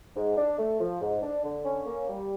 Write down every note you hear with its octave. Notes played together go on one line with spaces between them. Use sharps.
G#2
D4
A3
F3
G#2
D4
D3
C#4
A#3
G3